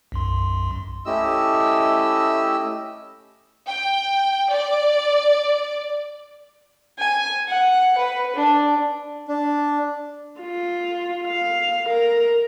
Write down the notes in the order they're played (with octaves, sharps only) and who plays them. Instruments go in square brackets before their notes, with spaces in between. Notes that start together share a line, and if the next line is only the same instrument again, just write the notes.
[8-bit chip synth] B1 F#2 C6
[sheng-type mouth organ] A3 C#4 E4 G4 D#5 E6
[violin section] G5
D5
[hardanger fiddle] G#5
F#5
B4
D4
[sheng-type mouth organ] D4
[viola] F4
F5
A#4